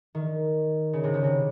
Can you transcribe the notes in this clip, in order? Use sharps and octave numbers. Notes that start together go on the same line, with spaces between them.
D#3
C#3
C3
C#3
C3